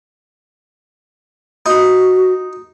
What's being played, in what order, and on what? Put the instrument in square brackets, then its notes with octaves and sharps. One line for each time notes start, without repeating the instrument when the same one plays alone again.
[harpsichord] D#4 [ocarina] F#4